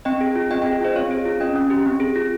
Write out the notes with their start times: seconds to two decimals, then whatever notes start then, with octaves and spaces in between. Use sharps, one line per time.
0.05 C4 D#5 G5
0.21 G#4
0.36 F4
0.51 C4 D#5 G5
0.62 G#4 D#5 G5
0.81 F4 C5 D#5
0.96 C4 C#5 F5
1.11 G#4
1.26 F4
1.40 C#4 D#5 G5
1.56 C#4
1.70 G4
1.86 C4
2.00 G#4
2.16 F4